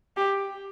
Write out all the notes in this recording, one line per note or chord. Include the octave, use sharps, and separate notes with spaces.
G4